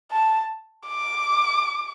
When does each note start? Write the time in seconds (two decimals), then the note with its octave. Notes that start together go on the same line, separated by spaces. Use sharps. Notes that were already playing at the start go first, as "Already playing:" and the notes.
0.11 A5
0.87 D6